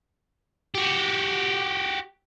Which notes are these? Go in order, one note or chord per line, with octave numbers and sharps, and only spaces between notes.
F#4 G4